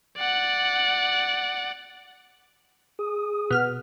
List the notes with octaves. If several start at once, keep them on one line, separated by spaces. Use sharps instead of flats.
D5 F#5
G#4 D#6
B2 F6